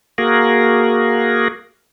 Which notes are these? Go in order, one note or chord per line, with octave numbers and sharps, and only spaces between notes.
A#3 F#4 G#4 A#4